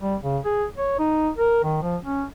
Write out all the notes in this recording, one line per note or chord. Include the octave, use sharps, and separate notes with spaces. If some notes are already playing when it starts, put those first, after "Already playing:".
G3
C#3
G#4
C#5
D#4
A#4
D#3
F3
C#4